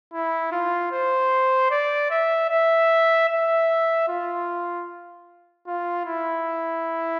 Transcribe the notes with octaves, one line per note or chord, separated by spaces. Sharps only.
E4
F4
C5
D5
E5
E5
E5
F4
F4
E4